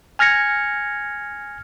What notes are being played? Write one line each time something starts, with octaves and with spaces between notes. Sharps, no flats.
G#5 F6 G#6 A#6 C#7